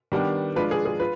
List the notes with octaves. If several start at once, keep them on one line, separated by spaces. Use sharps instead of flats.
D#3 G3 B3 D4
F3 G#3 D4 F4 B4
G#4
G#4
F4 B4